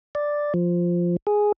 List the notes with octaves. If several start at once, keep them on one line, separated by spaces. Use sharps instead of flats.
D5
F3
G#4